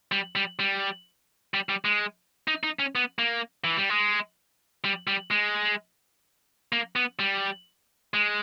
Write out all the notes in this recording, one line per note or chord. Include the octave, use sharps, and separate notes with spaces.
G3
G3
G3
G3
G3
G#3
D#4
D#4
C#4
B3
A#3
E3
G3
G#3
G3
G3
G#3
A#3
B3
G3
G#3